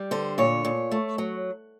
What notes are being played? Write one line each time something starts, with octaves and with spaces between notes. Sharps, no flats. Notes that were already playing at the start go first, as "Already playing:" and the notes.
Already playing: G3
D3 C5
A#2 C#5
A#2
A3
F#3